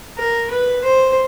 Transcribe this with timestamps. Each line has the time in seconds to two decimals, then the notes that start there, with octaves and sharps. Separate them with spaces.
0.18 A#4
0.51 B4
0.84 C5